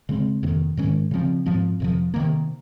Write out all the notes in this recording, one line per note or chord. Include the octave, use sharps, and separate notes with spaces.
C#3 G#3 C4
F2 C3 D#3 A#3
G#2 D#3 G#3 C#4
C#3 F3 C4
G#2 F3 C4
F2 C3 F3
C3 D#3 A#3